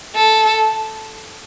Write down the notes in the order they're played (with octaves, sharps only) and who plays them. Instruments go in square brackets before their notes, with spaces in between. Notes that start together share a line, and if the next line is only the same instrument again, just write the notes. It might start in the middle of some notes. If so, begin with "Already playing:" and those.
[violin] A4